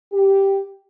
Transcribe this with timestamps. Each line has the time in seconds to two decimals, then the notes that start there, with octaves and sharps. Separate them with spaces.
0.13 G4